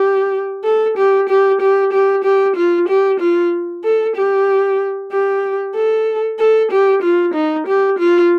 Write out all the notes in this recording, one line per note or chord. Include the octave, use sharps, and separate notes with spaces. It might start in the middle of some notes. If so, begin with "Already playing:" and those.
Already playing: G4
A4
G4
G4
G4
G4
G4
F4
G4
F4
A4
G4
G4
A4
A4
G4
F4
D#4
G4
F4